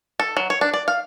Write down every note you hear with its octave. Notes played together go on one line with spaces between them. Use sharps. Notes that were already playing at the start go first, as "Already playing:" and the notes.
A4
F#3
C#5
D4
D5
F5